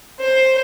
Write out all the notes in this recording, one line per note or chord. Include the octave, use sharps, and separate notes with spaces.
C5